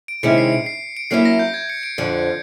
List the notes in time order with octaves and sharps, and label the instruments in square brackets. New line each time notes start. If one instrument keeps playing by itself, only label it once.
[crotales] D7
[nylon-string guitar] C3 D#3 G#3 C#4 E4 [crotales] C#7
[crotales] C7
D7
C7
D7
[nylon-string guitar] F#3 A#3 C#4 E4 [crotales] C7
[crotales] A#6
G6
G#6
C#7
D7
[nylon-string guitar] F2 D3 F3